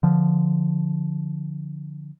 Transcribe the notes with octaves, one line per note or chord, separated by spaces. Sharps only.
D3 F3